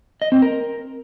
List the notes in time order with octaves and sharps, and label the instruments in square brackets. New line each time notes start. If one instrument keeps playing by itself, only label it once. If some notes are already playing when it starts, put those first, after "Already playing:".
[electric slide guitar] D#5
C4
A#4